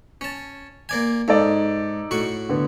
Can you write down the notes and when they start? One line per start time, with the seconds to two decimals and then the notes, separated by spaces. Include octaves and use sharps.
0.21 C#4 A5
0.89 A#3 D5 G#5
1.28 G#2 D#4 A4 D5
2.11 A2 F#4 C#6
2.49 D3 B3